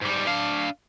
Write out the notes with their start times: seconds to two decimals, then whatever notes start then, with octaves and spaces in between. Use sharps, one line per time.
0.01 G#2 G3
0.27 D4 F5